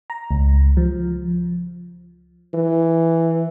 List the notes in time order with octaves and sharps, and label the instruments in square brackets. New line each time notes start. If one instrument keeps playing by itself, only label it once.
[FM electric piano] A#5
C#2
F3
[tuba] E3